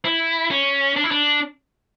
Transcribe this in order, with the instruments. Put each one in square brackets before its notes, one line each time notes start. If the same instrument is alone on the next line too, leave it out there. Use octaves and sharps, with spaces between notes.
[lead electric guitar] E4
C#4
D4
E4
D4